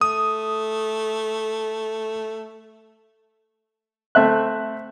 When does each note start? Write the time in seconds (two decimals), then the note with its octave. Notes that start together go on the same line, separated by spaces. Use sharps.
0.01 A3 D#6
4.15 A3 C4 E5 F#6